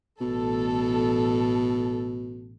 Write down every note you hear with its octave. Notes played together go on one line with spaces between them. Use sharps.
A1 B2 A4